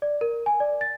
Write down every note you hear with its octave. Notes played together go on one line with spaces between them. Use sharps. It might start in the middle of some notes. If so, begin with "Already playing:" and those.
D5
A#4
G#5
D5
A6